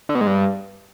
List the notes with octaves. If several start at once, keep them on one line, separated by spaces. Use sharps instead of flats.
D3
B2
G#2
G2